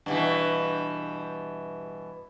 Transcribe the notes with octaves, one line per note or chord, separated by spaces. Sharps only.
G2 B2 E3